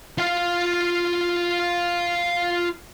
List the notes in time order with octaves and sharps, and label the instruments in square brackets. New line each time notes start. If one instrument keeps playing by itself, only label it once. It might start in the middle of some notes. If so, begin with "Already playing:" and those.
[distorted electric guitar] F4 F5